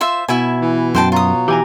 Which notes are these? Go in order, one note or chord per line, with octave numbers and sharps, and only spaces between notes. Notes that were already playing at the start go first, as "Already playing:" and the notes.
F4 C5 E5
B2 E4 E5 G#5
E3
F#2 C5 G5 A5
F#3 F4 D#6
E3 G4 G#5 A#5